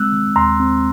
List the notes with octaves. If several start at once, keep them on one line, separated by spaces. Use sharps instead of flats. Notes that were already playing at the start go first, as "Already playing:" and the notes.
Already playing: G#3 C4 E6 F#6
D#3
D#2 A#5 C6
C4